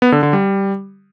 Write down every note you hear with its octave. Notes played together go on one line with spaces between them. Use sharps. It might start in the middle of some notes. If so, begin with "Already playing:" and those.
B3
D3
D3
G3